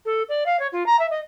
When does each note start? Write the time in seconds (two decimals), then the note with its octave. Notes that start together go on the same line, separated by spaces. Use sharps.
0.05 A4
0.29 D5
0.46 F5
0.59 C#5
0.72 F4
0.86 A#5
0.99 E5
1.10 D#5